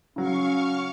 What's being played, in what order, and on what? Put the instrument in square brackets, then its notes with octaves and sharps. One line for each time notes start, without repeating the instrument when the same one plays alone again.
[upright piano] C#3 F#3 [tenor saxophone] C#4 [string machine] F5 C#6